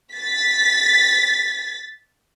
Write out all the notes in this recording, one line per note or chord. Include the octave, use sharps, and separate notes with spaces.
A6 B6